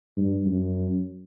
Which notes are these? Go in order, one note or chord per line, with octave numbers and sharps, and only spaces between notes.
G2
F#2